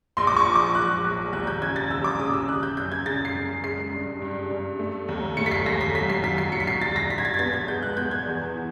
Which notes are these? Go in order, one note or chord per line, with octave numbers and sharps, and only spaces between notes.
A#1 C6
D6
C#6
F3
D6
F3 F#6
A#1
D#2 F#6
G6
C#3 G#6
A6
D#2 E6
D6
C#3 D#6
E6
C#3 F#6
G6
F#2 G6
G#6
C#3 A6
C7
F#2
G#3 C7
G2
G2
G2
A3
D#2
A3 C#7
B6
C7
D#2 A#6
B6
F#3 B6
C7
F#3 B6
C7
F#3 C#7
B6
C7
F#3 A6
A#6
G2 B6
G#6
A6
G#6
B3 A6
G#6
G#3 G6
F#6
B3 G6
G#6
E2
E3